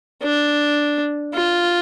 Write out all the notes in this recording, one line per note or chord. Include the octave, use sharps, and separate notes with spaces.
D4
F4